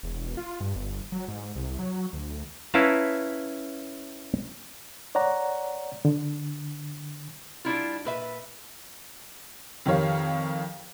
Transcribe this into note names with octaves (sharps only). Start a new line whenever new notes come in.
E1
F4
G2
G1
F#3
G#2
C2
F#3
D2
C#4 E4 B4 F5 A5 A#5
C#5 D5 F#5 A#5
D3
G3 D4 E4 F4
A#2 B4 E5
F2 D#3 G4 C#5 F5